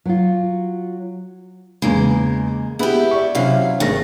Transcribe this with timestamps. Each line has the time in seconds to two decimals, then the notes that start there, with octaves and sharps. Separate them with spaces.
0.05 F#3 F4
1.82 E2 C#3 G#3 A#3
2.79 G#3 B3 E4 G4
3.11 D5 C#6
3.35 C3 F#3 C#4 E4 F5
3.80 G#1 G#3 A3 A#6